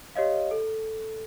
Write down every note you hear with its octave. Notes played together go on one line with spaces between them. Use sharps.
G4 C#5 D#5 F5
A4